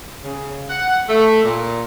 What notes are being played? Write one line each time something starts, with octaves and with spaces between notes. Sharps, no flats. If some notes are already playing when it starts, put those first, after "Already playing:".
C#3
F#5
A3
A#2